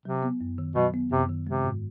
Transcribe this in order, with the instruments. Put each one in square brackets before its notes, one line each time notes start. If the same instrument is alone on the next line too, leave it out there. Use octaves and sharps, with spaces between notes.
[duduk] C3 [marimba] F#3
[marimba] B3
F#2
D#3
[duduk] B2 [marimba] F#3
[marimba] B3
[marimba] F#2 [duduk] C3
[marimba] D#3
[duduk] C3 [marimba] G#3
[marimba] G#2